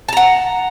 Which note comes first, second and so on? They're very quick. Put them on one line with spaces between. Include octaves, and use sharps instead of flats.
A5 A#5 F#5